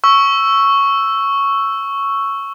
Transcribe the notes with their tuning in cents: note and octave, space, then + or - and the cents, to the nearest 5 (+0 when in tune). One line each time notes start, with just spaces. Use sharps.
C#6 +0 E6 +5